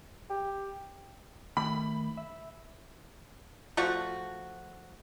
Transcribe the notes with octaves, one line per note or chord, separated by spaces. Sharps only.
G4
D#3 A3 B5
E5
F3 A3 F#4